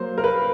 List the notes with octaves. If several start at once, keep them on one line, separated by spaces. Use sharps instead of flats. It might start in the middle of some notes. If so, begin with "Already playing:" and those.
Already playing: F#3 A#3 C5
A#4
B4